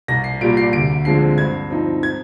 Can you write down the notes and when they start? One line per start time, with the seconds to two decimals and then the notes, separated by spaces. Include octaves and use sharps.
0.08 C2 A#6
0.24 C7
0.41 A#2 G3 D7
0.57 C7
0.73 D2 D7
1.05 D3 F3 G#3 C4 C7
1.38 G2 G#6
1.70 F3 C4 D#4
2.03 G#6